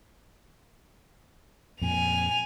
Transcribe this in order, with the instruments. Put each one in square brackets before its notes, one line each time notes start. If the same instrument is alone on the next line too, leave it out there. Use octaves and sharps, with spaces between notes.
[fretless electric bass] F2 A#2 [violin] G#5 F7